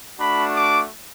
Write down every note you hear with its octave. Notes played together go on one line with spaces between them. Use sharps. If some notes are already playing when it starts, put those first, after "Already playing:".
A3 D4 F#4 B5
D6